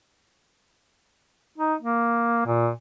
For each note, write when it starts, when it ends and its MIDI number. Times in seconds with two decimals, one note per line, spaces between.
1.58 1.75 63
1.82 2.41 58
2.46 2.70 46